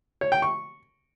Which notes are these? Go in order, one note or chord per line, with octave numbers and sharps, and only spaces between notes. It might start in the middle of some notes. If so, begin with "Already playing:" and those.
C#5
G5
C#6